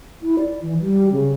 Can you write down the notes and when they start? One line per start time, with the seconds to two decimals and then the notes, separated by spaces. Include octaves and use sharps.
0.22 E4
0.38 D5
0.61 E3
0.80 G3
1.12 C#3